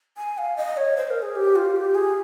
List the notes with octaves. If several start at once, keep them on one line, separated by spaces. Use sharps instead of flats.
G#5
F5
D#5
C#5
C5
A#4
G#4
G4
F4
G4
G#4